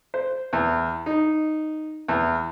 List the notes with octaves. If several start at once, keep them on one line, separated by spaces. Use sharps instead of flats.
C5
E2
D#4
E2